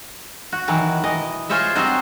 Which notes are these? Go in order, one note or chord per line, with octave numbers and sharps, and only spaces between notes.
F#4
B2 D#3 E3 F#3
E3 D#5
F4 G#4 C5 C#5 D#5 E5
F#3 G3 C4 F#4 C5 D#5